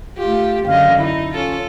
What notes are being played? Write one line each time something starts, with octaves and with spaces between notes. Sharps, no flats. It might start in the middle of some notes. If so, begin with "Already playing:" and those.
A3 F4 G4
F#2 D3 D#5 F5
D#4 E4
C#4 F4 A4